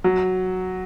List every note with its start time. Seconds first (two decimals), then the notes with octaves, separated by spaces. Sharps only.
0.04 F#3